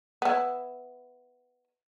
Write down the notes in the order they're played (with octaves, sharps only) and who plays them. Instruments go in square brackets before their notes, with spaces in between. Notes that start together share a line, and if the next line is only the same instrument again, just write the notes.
[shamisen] B3 E4